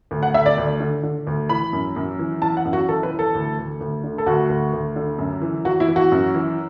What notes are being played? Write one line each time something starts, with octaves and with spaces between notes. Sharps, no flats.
D2
F#5
D2 E5
D5
D2
D3
D3
D2
E3 B5
F#2
F#2
E3
E3 A5
F#5
F#2
F#4
E3 A4
B4
E3
A4
D2
D2
D2
D3
A4
D2 F#4
D2
D2
D3
F#2
E3
E3 F#4
E4
E3
F#4
F#2
E3